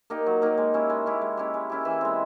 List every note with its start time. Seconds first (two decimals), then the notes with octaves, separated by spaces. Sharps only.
0.10 A#3 D#4 G4
0.26 F#3
0.42 A#3 D#4 G4
0.58 G#3
0.74 C#4 E4 G4
0.90 G#3
1.06 C#4 E4 G4
1.21 G#3
1.37 C#4 E4 G4
1.54 G#3
1.70 C#4 E4 G4
1.85 E3
2.01 G#3 C4